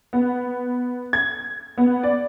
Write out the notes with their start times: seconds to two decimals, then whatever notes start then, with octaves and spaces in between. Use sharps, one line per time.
0.13 B3
1.13 G#6
1.78 B3
2.03 D5